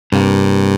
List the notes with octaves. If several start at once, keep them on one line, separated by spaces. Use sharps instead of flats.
C2 G2 C3 A#3